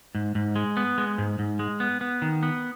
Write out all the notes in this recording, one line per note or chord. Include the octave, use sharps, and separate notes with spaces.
G#2
G#2
G#3
B3
G#3
G#2
G#2
G#3
B3
B3
D#3
B3